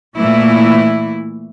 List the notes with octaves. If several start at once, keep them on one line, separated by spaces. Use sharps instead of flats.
A#2 E3 A3 E4